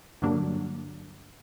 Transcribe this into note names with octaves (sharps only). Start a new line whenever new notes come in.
G2 D3 F#3 A#3 D4